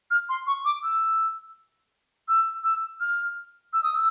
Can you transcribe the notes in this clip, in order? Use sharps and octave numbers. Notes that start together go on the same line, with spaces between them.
F6
C6
C#6
D6
E6
E6
E6
F6
E6
D#6
E6